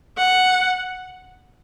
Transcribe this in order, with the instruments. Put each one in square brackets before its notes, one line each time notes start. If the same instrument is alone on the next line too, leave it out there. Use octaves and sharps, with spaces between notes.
[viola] F#5